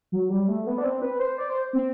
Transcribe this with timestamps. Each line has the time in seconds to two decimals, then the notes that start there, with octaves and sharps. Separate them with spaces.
0.12 F#3
0.30 G3
0.48 A3
0.66 B3
0.78 D4
0.84 C4
1.02 B4
1.19 C5
1.38 D5
1.49 C5
1.73 C4